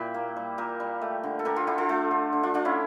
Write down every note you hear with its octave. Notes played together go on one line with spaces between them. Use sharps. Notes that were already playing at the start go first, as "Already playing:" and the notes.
Already playing: A#2 G3 E4 G4
A#3
G3
A#2 G4 A#4
G3
A3
D3
A4
D3 G4 A#4
F4 A4
D3 E4 G4
F4 A4
A3 F4 A4
D3
D3
D4 F4
D3 D4 F4
C#4 E4